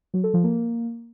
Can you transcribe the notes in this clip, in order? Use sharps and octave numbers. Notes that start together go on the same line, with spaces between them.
F#3
A4
F3
A#3